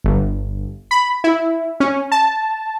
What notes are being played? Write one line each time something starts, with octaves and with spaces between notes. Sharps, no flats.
G1
B5
E4
C#4
A5